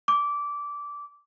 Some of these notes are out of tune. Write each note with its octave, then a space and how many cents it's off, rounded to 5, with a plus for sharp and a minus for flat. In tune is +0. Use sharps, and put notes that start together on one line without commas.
D6 -15